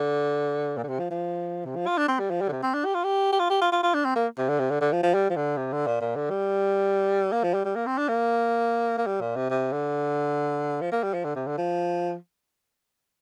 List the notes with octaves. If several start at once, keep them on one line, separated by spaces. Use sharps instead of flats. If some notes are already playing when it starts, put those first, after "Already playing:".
Already playing: D3
A#2
D3
C3
F3
F3
C3
F3
F4
D4
C4
G3
F3
G3
D3
C3
C4
D4
G4
F4
G4
G4
F4
G4
F4
F4
F4
D4
C4
A#3
C3
D3
C3
D3
D3
F3
F3
G3
F3
D3
C3
D3
A#2
A#2
D3
G3
A#3
F3
G3
G3
A#3
C4
D4
A#3
A#3
G3
A#2
C3
C3
D3
F3
A#3
G3
F3
D3
C3
D3
F3